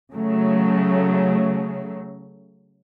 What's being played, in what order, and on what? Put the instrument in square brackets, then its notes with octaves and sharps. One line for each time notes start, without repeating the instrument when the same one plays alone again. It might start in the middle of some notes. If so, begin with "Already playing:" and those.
[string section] C#3 F#3 A3